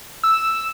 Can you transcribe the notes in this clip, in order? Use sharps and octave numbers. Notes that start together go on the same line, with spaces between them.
E6